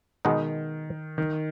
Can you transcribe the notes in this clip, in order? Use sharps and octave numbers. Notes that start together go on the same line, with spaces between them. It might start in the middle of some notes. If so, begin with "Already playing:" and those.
B2 D#3 G#3 B3 D#4
D#3